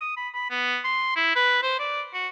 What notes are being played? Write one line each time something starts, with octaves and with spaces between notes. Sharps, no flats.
D#6
B5
B5
B3
C6
E4
B4
C5
D5
F#4